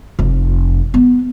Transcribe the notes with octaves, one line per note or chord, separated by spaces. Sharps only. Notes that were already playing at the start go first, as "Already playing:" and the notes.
F1
B3